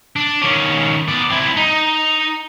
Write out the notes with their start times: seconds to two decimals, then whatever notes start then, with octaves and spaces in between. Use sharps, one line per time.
0.16 D4
0.42 D#3 C#4
1.08 B3 D5
1.30 C4 E4
1.57 D#4